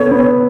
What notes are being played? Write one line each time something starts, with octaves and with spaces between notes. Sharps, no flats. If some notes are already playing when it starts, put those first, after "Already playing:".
Already playing: B3 A4 C#5
B3